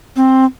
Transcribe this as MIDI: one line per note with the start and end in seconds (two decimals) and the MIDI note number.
0.16 0.45 60